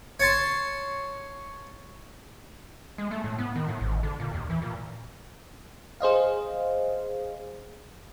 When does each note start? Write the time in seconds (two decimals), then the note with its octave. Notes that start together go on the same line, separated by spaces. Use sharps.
0.20 C#5 A5 C6
2.98 G#3
3.11 A3
3.24 A2
3.39 B3
3.56 D#3
3.68 A2
3.81 G#1
4.03 D3
4.20 A#2
4.34 D#2
4.50 E3
4.62 A#2
6.00 G#4 C5 D#5 F5